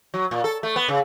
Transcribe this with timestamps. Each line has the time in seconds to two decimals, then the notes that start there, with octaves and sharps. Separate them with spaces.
0.14 F#3
0.31 A#2
0.44 A4
0.63 A3
0.76 B3
0.88 C#3